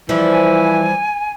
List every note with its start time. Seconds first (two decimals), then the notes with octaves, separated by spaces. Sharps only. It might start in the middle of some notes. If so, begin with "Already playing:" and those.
0.09 E3 F3 G3
0.31 G#5